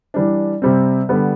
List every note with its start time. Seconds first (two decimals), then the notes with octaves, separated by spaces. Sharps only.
0.14 E3 G3 D4
0.62 C3 G3 C4
1.09 D3 G3 B3